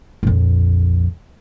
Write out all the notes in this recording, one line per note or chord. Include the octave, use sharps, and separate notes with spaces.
A#1 F2